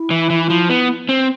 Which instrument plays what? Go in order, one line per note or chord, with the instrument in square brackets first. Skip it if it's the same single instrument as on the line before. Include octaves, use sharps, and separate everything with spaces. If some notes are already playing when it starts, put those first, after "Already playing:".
Already playing: [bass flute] E4
[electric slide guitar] E3
E3
F3
B3
C4